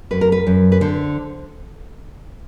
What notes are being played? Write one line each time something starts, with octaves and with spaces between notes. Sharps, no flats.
F#2 B4
A#4
B4
F#2
B4
D3 C5